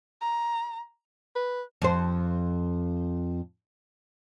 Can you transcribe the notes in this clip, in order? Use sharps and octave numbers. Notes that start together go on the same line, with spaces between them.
A#5
B4
F2 C5